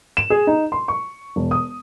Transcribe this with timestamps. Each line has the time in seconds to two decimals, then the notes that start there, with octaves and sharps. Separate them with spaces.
0.17 E7
0.30 G#4
0.47 D#4
0.72 C6
0.88 C#6
1.36 E1
1.51 D#6